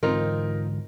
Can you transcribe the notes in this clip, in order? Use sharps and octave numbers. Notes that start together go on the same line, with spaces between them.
G#2 D3 E3 C4 D#4 F4 A#4